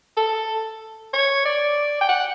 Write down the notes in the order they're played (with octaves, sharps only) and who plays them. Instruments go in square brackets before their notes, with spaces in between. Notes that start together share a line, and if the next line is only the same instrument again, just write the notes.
[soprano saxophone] A4
C#5
D5
G5
F#5